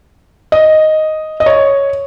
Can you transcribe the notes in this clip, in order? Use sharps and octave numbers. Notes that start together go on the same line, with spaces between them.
D#5
D#5
C#5